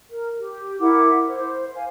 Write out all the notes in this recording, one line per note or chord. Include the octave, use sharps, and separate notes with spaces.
A#4
G4
E4 A#4 F#5 D6
C5
F5 G#5